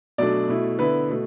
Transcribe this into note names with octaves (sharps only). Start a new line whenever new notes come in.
B2 F#3 A3 D4 D5
B2 A3 E4
D3 B3 E4 B4
B2 A3